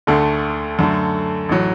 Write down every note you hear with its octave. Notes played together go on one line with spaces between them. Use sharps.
D2 D3 A3 A4
F#2 D3 A3
A1 A2 F#3